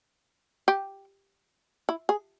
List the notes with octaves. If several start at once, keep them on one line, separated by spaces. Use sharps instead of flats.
G4
E4
G#4